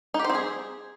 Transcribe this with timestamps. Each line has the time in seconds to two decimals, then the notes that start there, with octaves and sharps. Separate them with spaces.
0.14 D#4
0.19 G4
0.24 C5
0.30 C4
0.35 G#4